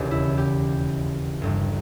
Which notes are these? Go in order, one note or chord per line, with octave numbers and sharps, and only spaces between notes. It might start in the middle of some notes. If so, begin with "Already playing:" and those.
Already playing: E1 D#2 C#3 E3 G4
E4
G4
G1 G2 G3